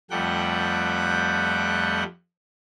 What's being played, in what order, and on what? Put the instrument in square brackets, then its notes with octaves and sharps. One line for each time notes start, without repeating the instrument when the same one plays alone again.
[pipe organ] F2 G3 A3 F#5 G5 F#6